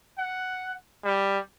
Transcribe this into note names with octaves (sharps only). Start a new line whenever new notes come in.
F#5
G3